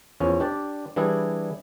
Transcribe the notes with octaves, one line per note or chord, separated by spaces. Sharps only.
E2 F3 C#4
D4 G4 D5
E3 G3 D4 E4 G#4